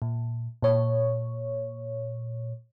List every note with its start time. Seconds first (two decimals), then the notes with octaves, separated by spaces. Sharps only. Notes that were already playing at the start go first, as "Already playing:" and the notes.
0.02 A#2
0.62 A#2 C#5